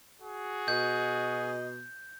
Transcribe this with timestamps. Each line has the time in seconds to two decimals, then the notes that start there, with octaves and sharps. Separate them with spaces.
0.21 F#4 G#4
0.68 B2 D#5 G6